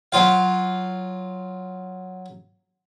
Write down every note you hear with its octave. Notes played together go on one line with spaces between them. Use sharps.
F#3 F4 F5